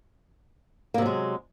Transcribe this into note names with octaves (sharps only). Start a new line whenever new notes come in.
C3 F#3 G#3 A#3